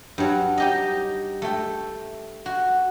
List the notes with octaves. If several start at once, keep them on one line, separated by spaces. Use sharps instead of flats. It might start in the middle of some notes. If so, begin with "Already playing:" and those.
G2 F#3
D#4 G4 D#5
A3 G5
F#4